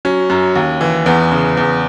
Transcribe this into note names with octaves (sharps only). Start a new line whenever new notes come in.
F#3 C#4
F#2
D#2
E3
E2 B3
C#3
E2